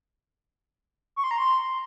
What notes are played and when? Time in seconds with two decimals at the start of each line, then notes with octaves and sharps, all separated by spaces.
1.16 C#6
1.24 C6
1.31 A#5
1.38 C6